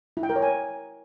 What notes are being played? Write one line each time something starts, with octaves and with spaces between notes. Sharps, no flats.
E4
G5
A#4
C#5
G#5